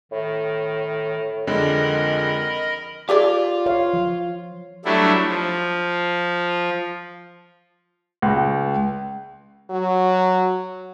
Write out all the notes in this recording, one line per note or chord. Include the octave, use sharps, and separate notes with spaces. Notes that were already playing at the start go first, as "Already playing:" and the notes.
A2 D#3
F2 D3 D#3 G#3 A#4 D#5 B5
F4 G4 G#4 D5
C#5 F5
F3
F#3 G3 A3 D4 E4
F3
C#2
F#3